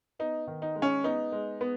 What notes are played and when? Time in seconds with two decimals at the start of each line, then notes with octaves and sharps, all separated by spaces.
0.19 B3 D#4
0.47 D#3
0.62 D#4
0.75 G#3
0.82 C#4
1.04 B3 D#4
1.32 G#3
1.61 B3